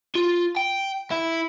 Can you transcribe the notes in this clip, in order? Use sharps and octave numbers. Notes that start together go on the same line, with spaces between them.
F4
G5
E4